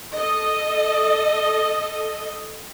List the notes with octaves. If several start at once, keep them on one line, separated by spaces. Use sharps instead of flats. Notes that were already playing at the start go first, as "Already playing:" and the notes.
A4 D#5